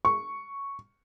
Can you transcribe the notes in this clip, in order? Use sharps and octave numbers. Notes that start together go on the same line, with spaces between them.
C#6